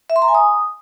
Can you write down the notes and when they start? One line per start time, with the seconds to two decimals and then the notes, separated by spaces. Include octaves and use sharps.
0.10 E5
0.16 C6
0.22 A#5
0.28 G#5
0.35 D#6